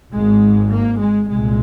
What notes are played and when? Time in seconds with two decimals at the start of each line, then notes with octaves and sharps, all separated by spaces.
0.13 G#1 G#2 G#3
0.71 A#3
1.00 G#3
1.30 C2 A#2 G#3